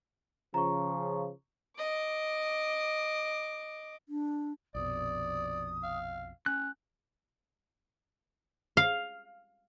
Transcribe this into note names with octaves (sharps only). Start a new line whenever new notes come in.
C#3 F3 A#5 C#6
D#5 D6
D4
A#1 F2 B2 D5 D#6
F5
C#4 F#6
F5